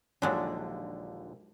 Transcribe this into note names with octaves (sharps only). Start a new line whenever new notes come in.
A#1 D#2 D3 F#3 G#3 D4